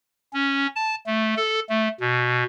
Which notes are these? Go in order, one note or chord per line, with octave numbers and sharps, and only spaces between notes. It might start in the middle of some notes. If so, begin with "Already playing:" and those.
C#4
A5
A3
A4
A3
B2